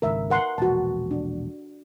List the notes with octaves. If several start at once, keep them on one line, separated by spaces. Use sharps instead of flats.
G#1 C#2 A#4 E5
A#4 F#5 C6
E1 A#1 F#4 A5
D4